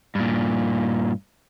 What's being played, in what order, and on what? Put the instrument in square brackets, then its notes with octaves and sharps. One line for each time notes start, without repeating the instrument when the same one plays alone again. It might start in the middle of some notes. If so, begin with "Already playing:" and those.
[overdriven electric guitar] G2 A#2